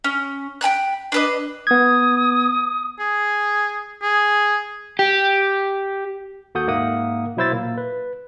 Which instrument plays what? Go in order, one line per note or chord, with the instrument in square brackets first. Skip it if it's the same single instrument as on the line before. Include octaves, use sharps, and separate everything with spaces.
[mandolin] C#4
G5 G#5 B5 F#6
D4 B4 D#5
[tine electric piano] B3 G#6 [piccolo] D#6
[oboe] G#4
G#4
[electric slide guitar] G4
[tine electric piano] D#2 F#4 A4 F#5 D#6 G6
G#2 A#3 E5 F#5 D#6
B2 F#3 E4 C5 E6 A6
A#2 A#3
B4